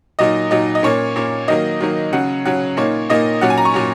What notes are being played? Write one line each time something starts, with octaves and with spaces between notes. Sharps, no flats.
A#2 F#3 D#4 D#5
A#2 F#3 D#4 D#5
D#5
A#2 A#3 C#4 C#5
A#2 A#3 C#4
D#3 F#3 A#3 D#5
D#3 F#3 A#3
C#3 F#3 C#4 F#5
C#3 F#3 C#4 F#5
A#2 A#3 D#4 C#5
A#2 A#3 D#4 D#5
A#2 F#3 C#4 F#5
G#5
A#5
C#6
A#2 F#3 C#4